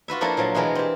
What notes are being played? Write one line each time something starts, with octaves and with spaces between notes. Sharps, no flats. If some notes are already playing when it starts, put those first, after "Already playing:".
F4 F#4 B4 E5
F3 A#3 D4 E4 A4 A#4
A#2 F3 F#3 F5
B2 E3 G#3 B3 A#4
C4 G4